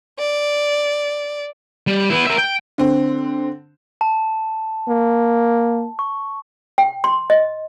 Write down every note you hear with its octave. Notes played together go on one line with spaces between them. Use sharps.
D5
G3
B3 E4
A#4 E5
G5
D3 C4
A5
A#3
C#6
G5
C6
D#5